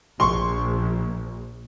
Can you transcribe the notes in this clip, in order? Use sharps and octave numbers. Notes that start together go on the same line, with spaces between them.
A#1 C6 C#6